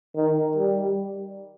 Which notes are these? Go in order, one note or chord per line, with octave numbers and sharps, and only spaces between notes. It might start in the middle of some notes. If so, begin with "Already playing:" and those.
D#3
G3